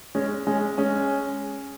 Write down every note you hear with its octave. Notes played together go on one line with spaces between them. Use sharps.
G#3 C#4
G#3 C#4
G#3 C#4